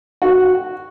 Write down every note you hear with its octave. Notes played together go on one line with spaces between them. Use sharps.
F#4